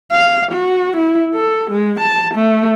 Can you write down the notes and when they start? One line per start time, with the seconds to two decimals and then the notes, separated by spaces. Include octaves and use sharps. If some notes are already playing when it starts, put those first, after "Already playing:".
0.12 F5
0.52 F#4
0.97 E4
1.34 A4
1.71 G#3
2.00 A5
2.34 A3